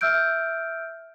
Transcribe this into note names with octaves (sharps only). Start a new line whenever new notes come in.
E5 E6 F6 G6 D7